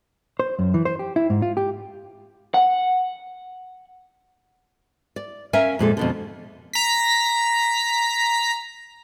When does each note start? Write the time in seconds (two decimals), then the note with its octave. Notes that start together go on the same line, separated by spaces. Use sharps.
0.40 C5
0.59 F#2
0.74 E3
0.85 C5
0.99 G4
1.16 E4
1.30 G#2
1.42 F4
1.57 G4
2.54 F#5
5.16 D5
5.53 C#4 A#4 E5 F5 G#5
5.79 F2 A#2 G#3 A4
5.97 F2 B2 D3
6.73 A#5 B6